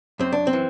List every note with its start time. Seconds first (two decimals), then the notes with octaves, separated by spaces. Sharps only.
0.19 F#2 C4
0.32 D4
0.47 C4
0.53 E3